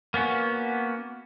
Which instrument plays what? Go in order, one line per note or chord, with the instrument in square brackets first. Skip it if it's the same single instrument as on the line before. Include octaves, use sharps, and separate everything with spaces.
[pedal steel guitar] A#3 B3 C#4 F#4